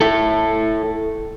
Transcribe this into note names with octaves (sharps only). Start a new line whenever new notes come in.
E4 A4